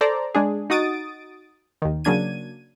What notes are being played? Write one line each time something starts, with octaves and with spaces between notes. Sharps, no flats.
A4 C5 D5 A#5
G#3 D4 G#4
D#4 F#4 D#6 A6 D7
D#2 D#3
C#3 F#3 A#3 D4 G#6 D#7